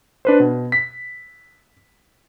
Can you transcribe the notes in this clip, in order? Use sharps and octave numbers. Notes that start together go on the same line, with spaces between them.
D4 B4 C5
B2
B6